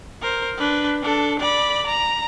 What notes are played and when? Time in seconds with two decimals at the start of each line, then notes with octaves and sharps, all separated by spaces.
0.21 A#4 C5
0.58 D4 B4
1.02 D4 A4
1.39 D5 B5
1.86 A#5